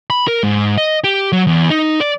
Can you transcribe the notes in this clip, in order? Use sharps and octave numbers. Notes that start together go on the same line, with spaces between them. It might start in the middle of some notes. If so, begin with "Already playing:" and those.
B5
A#4
G#2
D#5
G4
F#3
E2
D#4
D5